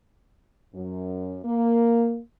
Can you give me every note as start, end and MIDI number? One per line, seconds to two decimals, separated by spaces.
0.74 1.39 42
1.45 2.19 58